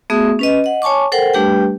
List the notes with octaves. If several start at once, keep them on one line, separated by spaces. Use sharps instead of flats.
A3 B3 F#4 G#4 E5 D#6
C#4 B4 D#5
D#5 F#5
C#5 G#5 A5 C#6 D6
A4 A#4 C5 F#5 G5
G3 A3 D4 G4 B4 G5